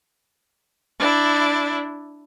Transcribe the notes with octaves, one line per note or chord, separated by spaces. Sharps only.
D4 E4